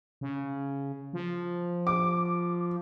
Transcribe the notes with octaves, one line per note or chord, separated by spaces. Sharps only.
C#3
F3
D6